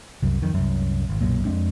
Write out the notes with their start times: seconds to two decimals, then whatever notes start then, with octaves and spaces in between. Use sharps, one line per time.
0.22 C2 F#2
0.42 F2 D#3
0.54 C2 F#2
1.09 G#1
1.21 B1 F#2 A#2
1.45 F2 G#3 C4 D4